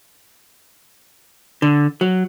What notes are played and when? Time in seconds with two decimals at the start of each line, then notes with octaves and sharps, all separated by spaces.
1.62 D3
2.01 F#3